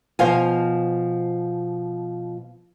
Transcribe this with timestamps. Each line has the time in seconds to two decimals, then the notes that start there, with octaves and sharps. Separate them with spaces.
0.19 B2 F3 C5 F5 G#5